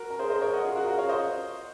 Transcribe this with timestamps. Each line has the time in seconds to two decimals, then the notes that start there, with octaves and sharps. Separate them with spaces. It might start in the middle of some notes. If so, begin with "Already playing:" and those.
Already playing: F#4 A#4
0.10 A#4
0.19 G#4 C5
0.30 C5 D#5
0.41 A#4 C#5
0.53 D#5 F#5
0.65 F4 G#4
0.75 F#4 A#4
0.86 F#4 A#4
0.98 C#5 F5
1.09 C5 D#5